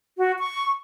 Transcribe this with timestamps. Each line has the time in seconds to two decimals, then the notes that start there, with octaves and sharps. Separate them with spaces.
0.18 F#4
0.39 C#6